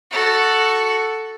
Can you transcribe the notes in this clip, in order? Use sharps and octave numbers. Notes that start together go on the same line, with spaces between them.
F#4 A4